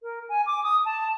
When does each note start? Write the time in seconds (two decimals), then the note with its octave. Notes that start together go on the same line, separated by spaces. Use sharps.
0.02 A#4
0.29 G#5
0.46 D6
0.63 D#6
0.85 A5